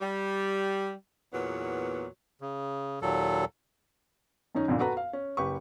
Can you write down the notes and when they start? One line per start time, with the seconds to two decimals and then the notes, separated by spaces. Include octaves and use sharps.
0.01 G3
1.34 E2 A#2 F#3 B3
2.41 C#3
3.02 D#2 A#2 F#3 A4
4.55 F#2 D#3 C#4 D#4
4.68 G1 F2 A#2 D3
4.80 F#4 A4 B4 A#5
4.97 F5
5.13 C#4
5.37 F#1 G4 B4 C#6